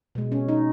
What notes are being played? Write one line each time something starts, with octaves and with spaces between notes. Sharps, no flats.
B2 G#3
C#4
D#4